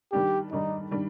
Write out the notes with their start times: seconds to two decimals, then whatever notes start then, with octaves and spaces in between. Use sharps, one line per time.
0.12 D#3 G3 D4 G4
0.52 D#3 G3 D4 D#4
0.91 D#3 G3 D4